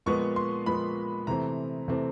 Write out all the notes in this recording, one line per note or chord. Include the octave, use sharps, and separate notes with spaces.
A#2 F3 G#3 B3 C#6
C6
A#2 F3 G#3 B3 B5
C3 E3 A3 C4 A#5
C3 E3 A3 C4